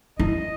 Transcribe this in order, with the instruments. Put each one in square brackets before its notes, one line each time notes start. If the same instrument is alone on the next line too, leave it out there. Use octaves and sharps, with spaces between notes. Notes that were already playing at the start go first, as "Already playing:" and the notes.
[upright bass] E4 [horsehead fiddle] D#5